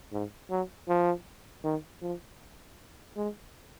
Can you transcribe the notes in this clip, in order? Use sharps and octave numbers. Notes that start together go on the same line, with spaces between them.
G#2
F#3
F3
D#3
F3
G#3